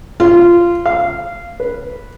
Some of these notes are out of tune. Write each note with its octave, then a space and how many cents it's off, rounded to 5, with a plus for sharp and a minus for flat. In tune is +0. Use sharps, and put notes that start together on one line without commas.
F4 -15
F5 -15
B4 -5